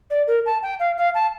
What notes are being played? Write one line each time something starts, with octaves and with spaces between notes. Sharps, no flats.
D5
A#4
A5
G5
F5
F5
A5